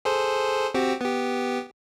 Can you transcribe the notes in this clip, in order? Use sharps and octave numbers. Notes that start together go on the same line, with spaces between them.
G#4 A4 C5
C4 F#4 G4
B3 G4